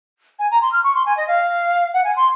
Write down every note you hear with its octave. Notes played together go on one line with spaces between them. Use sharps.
G#5
A#5
C6
F6
C#6
C6
G#5
D#5
F5
F#5
G#5
C6